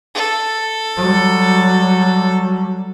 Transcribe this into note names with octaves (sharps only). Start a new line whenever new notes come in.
A4
F#3 G3